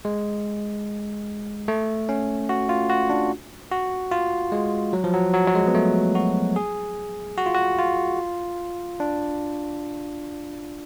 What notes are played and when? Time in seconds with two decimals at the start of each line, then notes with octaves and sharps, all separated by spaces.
0.05 G#3
1.68 A3
2.09 C#4
2.49 F#4
2.69 F4
2.90 F#4
3.10 D4
3.72 F#4
4.11 F4
4.52 G#3
4.93 F#3
5.04 F3
5.14 F#3
5.34 F#3
5.48 F#3
5.55 G#3
5.67 B3
5.75 A3
6.15 F#4
6.56 G#4
7.37 F#4
7.46 F4
7.55 F#4
7.78 F4
9.00 D4